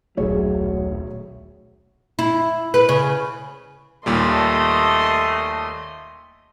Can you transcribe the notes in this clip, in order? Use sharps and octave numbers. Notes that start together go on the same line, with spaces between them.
D#1 B1 F#3 A3 G#4 C#5
E4
B4
C#3
D#2 A#2 G3 A3 D#5 C6